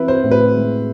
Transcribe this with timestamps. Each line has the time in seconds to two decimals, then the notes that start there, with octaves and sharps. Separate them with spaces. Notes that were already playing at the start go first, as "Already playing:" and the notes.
Already playing: E3 C4 E4 B4
0.08 C5
0.24 A2
0.31 B4
0.55 G#3